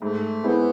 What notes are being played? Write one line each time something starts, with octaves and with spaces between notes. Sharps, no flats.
G#2 A3
G#3 B3 C4 E4